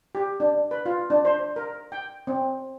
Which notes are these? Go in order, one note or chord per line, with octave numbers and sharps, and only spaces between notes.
G4
D4
B4
F4
D4
C5
A#4
G5
C4